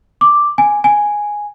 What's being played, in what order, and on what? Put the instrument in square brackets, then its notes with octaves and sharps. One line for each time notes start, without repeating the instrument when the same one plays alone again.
[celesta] D6
G#5
G#5